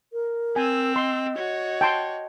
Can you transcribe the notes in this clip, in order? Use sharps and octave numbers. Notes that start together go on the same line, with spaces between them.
A#4
C4 G#5 E6
D#5 C6
F#4 C#5
G5 A5 C6